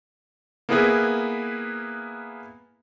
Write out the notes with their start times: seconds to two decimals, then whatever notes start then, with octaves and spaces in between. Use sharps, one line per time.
0.69 A#3 B3 E4 G#4 A#4 B4